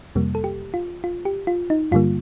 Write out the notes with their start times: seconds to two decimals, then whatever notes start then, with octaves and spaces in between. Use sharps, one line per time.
0.15 F2 C3 G3 A#3
0.35 A4
0.44 G4
0.74 F4
1.04 F4
1.25 G4
1.47 F4
1.70 D#4
1.92 G2 D3 G3 A#3 F4